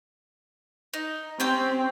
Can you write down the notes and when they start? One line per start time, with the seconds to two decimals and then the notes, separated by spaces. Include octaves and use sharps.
0.93 D#4
1.40 C4 C#4 G4 G5